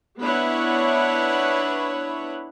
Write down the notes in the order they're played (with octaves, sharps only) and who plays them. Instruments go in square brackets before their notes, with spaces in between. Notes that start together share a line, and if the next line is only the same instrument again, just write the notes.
[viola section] B3 D4 E4 B4 C#5 F#5